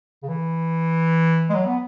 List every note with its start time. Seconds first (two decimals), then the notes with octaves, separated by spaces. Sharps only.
0.23 C#3
0.28 E3
1.50 G#3
1.55 F#3
1.66 B3